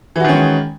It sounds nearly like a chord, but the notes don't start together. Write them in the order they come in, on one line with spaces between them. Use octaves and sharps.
E3 F#4 D#3 C#4 G#3